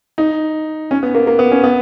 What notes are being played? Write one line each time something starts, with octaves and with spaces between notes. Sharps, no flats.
D#4
C#4
B3
A#3
A#3
B3
C#4
B3